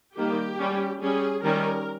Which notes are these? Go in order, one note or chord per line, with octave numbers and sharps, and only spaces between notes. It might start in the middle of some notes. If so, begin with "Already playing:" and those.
D#3 G3 A#3 G4
G3 C#4
G3 C#4 G#4
D#3 G3 C#4 A#4